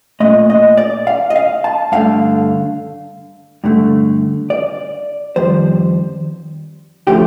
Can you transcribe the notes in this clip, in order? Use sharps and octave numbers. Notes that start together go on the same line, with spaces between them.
A#2 A3 D#5
D#5
D5
F5
D#5
F5
A5
G2 D3 A3 F5
G2 D3 A3
D5
F2 D#3 G3 C5
D3 F3 A3 G4